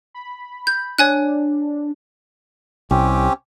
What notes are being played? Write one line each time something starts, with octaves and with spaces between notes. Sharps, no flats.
B5
G6
D4 C#5 G#5 F#6
C2 C4 C#4 G4